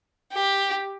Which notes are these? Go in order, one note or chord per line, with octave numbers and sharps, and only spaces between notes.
G4